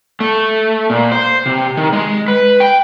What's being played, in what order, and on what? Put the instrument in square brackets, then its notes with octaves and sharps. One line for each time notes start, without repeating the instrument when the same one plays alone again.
[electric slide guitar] A3
A#2
C5
C3
D#3
G#3
B4
G5